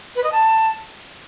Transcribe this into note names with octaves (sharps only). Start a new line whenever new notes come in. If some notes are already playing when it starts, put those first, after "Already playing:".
B4
D#5
A5